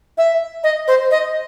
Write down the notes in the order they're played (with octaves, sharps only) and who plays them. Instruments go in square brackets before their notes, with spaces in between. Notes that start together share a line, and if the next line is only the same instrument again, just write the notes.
[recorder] E5
D#5
C5
D#5